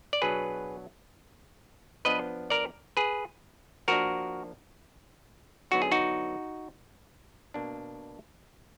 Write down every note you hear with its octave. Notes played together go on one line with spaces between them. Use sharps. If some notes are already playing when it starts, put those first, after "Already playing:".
D5
B2 F#3 B3 D4 G#4 B4
F3 B3 D4 B4 D#5
A#4 D5
G#4 B4
F3 A#3 D4 F#4 A#4
D3 F#3 B3 D#4 F#4
G#4
D#4 F#4
B2 A#3 D4